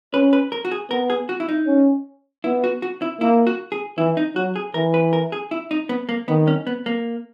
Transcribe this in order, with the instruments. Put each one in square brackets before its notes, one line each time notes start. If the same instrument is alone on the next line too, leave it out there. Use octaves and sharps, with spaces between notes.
[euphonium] C#4 [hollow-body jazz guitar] B4
[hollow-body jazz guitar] B4
A#4
F#4
G#4
[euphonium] B3 [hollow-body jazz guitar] A#4
[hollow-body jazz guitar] G#4
F#4
E4
D#4
[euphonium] C#4
[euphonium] B3 [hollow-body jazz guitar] E4
[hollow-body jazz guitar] F#4
F#4
E4
[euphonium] A#3 [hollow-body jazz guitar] E4
[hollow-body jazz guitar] F#4
G#4
[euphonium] E3 [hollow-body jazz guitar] E4
[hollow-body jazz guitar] D#4
[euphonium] F#3 [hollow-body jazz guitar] F#4
[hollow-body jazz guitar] G#4
[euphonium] E3 [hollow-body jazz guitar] A#4
[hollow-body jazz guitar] B4
A#4
G#4
E4
D#4
B3
A#3
[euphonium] D#3 [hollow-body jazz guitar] B3
[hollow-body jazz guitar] C#4
B3
A#3